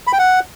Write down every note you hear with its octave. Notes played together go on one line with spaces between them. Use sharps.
B5
G5
F#5